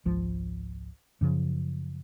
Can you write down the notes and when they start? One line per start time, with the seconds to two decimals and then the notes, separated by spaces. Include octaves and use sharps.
0.05 G#1 C#2 F3
1.21 F#2 C#3 F3